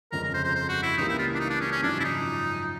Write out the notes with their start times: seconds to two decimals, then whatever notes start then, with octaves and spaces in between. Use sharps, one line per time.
0.12 G1 F2 C#3 F3 G#3 A#4
0.24 A#4
0.34 C5
0.44 C5
0.56 C5
0.69 F#4
0.83 E4
0.97 C#2 C#3 E3 G3 A#3 D#4
1.08 E4
1.19 F4
1.35 D4
1.40 D#4
1.50 D4
1.61 C#4
1.72 C#4
1.82 G#1 F#2 C#3 F3 D4
2.00 E4
2.04 D#4